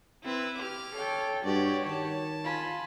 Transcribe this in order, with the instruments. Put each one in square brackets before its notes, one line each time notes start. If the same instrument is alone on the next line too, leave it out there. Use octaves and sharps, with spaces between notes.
[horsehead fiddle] C4 [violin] E4 B4
[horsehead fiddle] G4 [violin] D6 F6
[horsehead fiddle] A4 G5 [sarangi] C#5
[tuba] G2 [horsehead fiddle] F#4 G4 [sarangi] C#5 [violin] D5
[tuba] D#3 [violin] A5
[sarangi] F4 [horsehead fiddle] G#5 B5